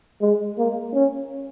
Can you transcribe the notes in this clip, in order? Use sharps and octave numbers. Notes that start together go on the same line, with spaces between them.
G#3
A#3
C#4